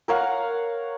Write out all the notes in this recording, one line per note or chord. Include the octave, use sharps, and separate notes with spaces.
A#4 C#5 F5 F#5